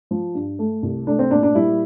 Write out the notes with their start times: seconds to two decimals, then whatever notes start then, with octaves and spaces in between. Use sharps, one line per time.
0.11 F3
0.35 G2
0.59 A3
0.82 C2
1.07 A3 D4
1.19 C4
1.31 A#2 D4
1.43 D4
1.55 G3 E4